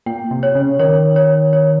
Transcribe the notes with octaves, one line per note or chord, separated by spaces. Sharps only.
A#2 G5
C3
C#5
C#3
D#3 C#5
C#5
C#5